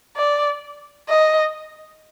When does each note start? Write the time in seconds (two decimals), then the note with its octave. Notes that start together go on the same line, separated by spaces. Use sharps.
0.17 D5
1.09 D#5